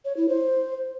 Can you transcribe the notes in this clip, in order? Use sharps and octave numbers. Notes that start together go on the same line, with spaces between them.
C#5
E4
C5